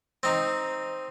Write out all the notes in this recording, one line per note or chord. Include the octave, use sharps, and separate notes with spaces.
C4 D#4